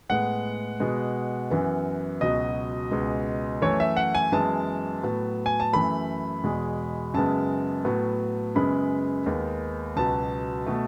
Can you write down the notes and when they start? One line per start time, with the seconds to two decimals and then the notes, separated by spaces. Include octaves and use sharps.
0.09 A2 G#3 B3 F#5
0.80 B2 G#3 B3
1.50 F#2 E3 B3
2.21 C#2 B2 F#3 D#5
2.91 C#2 B2 G#3 B3
3.62 F#2 E3 A3 C#5
3.80 E5
3.97 F#5
4.15 G#5
4.32 F#2 E3 G#3 B3 A5
5.03 A2 F#3 B3
5.46 G#5
5.60 A5
5.73 F#2 E3 A3 B5
6.44 E2 B2 G#3
7.14 F#2 C#3 G#3 B3 A5
7.84 A2 F#3 B3
8.55 F#2 C#3 G#3 B3 B5
9.26 D#2 D#3 G#3 B3
9.96 C#2 B2 F#3 B3 A5
10.66 B2 A3